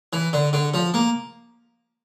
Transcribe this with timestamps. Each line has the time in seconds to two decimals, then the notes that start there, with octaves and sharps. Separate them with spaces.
0.13 E3
0.33 D3
0.53 D3
0.74 F3
0.94 A#3